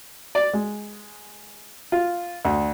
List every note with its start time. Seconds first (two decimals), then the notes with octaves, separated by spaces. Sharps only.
0.35 D5
0.53 G#3
1.92 F4
2.45 D2